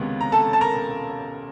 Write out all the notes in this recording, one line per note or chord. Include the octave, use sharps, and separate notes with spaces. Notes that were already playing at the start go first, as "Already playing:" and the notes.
Already playing: C#2 C3 D#3 G#3 B3
A#5
A4 A5
A5
A#4 A#5